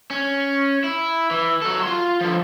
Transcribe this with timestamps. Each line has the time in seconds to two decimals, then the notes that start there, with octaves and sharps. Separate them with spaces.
0.11 C#4
0.84 E4
1.31 E3
1.62 F#3 A4
1.83 F4 C6
2.21 D3 F3